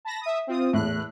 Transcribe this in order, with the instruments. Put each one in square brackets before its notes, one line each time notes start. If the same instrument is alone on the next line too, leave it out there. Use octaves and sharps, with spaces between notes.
[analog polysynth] A5 B5 A#6
E5 D#6
C4 F4 D#6
[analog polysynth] E2 F#6 [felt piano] A2